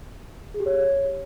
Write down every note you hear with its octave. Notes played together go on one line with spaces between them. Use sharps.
G#4
G4
C#5